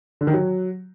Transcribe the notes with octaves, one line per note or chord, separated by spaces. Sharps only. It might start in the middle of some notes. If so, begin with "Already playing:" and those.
D3
D#3
F#3